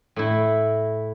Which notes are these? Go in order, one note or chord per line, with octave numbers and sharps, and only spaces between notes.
A2 E4